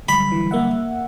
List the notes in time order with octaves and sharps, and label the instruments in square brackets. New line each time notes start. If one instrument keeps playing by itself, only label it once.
[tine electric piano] D3 F#3 G3 [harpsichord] B5
[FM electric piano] E3
A#3 E5 F#5